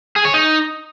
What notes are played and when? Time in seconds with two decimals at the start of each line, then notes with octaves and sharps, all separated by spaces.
0.16 G#4
0.25 C#5
0.34 D#4